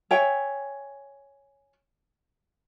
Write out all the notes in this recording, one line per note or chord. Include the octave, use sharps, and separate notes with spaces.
C#5 E5 G5 G#5